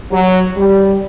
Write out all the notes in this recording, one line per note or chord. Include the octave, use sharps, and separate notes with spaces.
F#3
G3